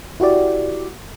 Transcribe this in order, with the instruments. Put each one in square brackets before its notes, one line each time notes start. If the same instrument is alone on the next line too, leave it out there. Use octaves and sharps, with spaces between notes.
[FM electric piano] E4 F#4 G4 D5